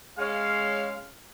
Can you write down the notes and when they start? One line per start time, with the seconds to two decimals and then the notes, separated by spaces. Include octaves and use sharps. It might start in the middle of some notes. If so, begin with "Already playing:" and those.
0.18 G#3 C#4 F5